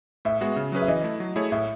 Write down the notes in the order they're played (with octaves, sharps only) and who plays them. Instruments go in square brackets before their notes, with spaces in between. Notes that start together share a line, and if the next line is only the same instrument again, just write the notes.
[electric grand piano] A2 [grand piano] E5
[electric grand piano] G#3 B3 F#4
C#3
F#3 C#4 G#4 B4
[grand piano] E5
[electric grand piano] E3 [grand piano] D#5
[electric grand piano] A3 E4
F#3
A3 E4 G#4 C#5
[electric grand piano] A2 [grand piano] E5